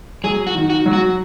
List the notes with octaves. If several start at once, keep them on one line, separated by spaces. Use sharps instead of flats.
F#3 G#4
F#4
D#3
F#4
F#3
F#4